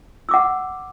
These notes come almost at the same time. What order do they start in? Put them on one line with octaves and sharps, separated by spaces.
E6 D6 F#5